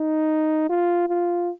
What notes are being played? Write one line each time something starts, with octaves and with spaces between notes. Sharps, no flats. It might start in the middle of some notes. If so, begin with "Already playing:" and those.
Already playing: D#4
F4
F4